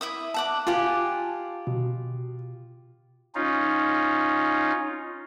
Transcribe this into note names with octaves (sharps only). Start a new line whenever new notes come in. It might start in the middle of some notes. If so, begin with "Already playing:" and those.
E4 E5 D#6
E5 F#5 A5 D6
F4 G4 F#5 G#5
B2
C#4 D#4 F4